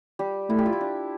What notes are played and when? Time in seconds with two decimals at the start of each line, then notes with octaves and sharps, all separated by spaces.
0.19 G3 G4
0.50 A3 E4
0.58 G4
0.66 F4
0.73 E4
0.81 D4